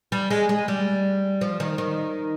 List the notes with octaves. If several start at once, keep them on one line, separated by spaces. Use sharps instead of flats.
G3
G#3
G#3
G3
F3
D#3
D#3